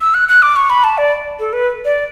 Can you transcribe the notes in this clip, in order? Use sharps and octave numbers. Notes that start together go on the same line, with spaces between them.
E6
F#6
F#6
D6
C#6
B5
A5
D5
A4
B4
D5